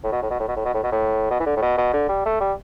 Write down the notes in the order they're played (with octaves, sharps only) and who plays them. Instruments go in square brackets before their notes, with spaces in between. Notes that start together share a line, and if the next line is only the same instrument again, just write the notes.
[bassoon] A2
B2
A2
B2
A2
B2
A2
B2
A2
B2
A2
B2
E3
D3
A2
B2
B2
D3
G3
A3
G3